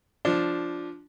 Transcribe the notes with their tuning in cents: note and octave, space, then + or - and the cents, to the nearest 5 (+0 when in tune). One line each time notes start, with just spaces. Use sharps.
F3 +0 D4 +0